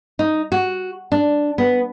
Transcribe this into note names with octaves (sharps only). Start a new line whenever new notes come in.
D#4
F#4
D4
B3